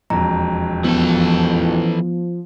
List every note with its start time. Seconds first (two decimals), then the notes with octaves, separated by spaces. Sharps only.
0.10 E1 F2 A#5
0.84 E3 F3 B3 A4